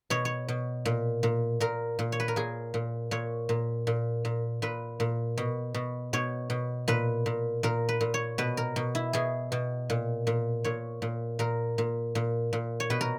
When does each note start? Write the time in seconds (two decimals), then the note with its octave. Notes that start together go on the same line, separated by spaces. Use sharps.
0.10 B2 C#5
0.25 C#5
0.48 B2
0.85 A#2
1.23 A#2
1.60 A#2 A#4
1.99 A#2
2.12 C#5
2.20 B4
2.28 A#4
2.36 A#2 G#4
2.74 A#2
3.11 A#2 C#5
3.49 A#2
3.87 A#2
4.25 A#2
4.62 A#2 B4
5.00 A#2
5.37 B2
5.74 B2
6.13 B2 C#5
6.50 B2
6.88 A#2 B4
7.26 A#2
7.63 A#2 A#4
7.89 B4
8.01 A#2
8.14 C#5
8.38 B2 B4
8.57 A#4
8.76 B2
8.95 E4
9.13 B2 G#4
9.52 B2
9.90 A#2
10.27 A#2
10.64 A#2 C#5
11.02 A#2
11.39 A#2 A#4
11.78 A#2
12.15 A#2
12.53 A#2
12.80 C#5
12.90 B2 B4
13.01 A#4